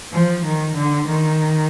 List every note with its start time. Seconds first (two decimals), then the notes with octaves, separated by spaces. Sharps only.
0.12 F3
0.45 D#3
0.77 D3
1.09 D#3